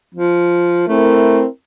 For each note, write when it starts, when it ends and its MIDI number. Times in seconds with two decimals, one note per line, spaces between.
0.15 0.84 53
0.88 1.42 57
0.88 1.47 60
0.88 1.47 64
0.88 1.47 70